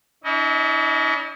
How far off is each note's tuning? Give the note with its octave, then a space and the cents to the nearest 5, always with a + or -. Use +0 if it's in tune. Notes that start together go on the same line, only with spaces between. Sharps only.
C#4 +45 E4 -40 D#5 +0